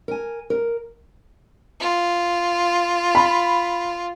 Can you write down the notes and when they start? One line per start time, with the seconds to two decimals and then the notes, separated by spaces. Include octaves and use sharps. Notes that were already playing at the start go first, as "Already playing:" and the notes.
0.08 A#4 G#5
0.50 A#4
1.80 F4
3.15 B5